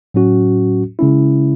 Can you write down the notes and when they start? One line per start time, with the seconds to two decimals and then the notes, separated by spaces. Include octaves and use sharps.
0.14 A2 F#3 C#4 F#4
0.99 C#3 G#3 C#4 E4